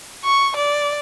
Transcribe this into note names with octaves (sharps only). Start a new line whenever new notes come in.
C#6
D5